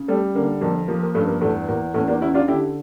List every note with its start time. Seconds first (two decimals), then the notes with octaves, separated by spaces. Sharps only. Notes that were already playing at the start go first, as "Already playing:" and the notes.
Already playing: C#3
0.08 G3 A3
0.35 D3 A#3
0.61 F2 A#3
0.88 F3 A#3
1.02 A#3
1.15 G2 A3 C#4
1.28 A#3
1.41 E2 A3
1.68 E2 A#3
1.94 E2 A3 C#4
2.08 A#3 D4
2.21 C#3 C#4 E4
2.34 D4 F4
2.48 D3 E4 G4